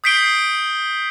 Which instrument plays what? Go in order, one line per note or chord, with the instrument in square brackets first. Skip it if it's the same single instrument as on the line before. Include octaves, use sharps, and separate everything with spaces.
[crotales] D#6 G6 B6 C7 D7 G7